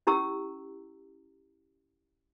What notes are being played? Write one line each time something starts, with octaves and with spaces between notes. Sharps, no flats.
C#4 E4 G4 A#5 E6